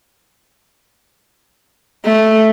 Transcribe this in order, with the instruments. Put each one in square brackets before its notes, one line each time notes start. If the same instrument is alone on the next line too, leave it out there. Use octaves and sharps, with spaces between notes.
[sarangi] A3